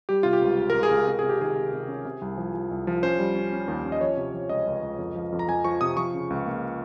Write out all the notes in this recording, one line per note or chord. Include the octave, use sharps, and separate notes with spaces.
G3 G4
C3 F4
G4
C#2
C#2
C#2 A#4
G#4
C#2 A#4
C3 A#4
C3 G#4
G4
D#3 G#4
C3
C3
C#4
C3
C2
F3
F3
C2
F3
C#4 C5
G3
C#4
C#4
D#2
C#4
D#5
F3 C#5
C3
F3
C#2 D#5
C#2
C#2
F2
F3
F2
A#5
F2 G#5
F3 C#6
C3 D#6
F3 C#6
C#3
C#2
A#3